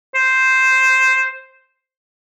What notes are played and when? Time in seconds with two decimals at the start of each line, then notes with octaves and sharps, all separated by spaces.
0.15 C5